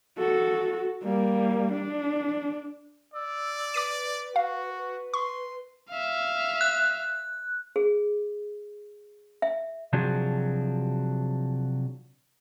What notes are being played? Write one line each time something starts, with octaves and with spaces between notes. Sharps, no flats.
F#4 A4
G3 A#3
D4
D5 E6
B4 D6 B6 D#7
F#4 F5
B4
C6 C#6
E5 F5
F#6
G#4
E5
C3 F3 F#3 D4 F#4 G#4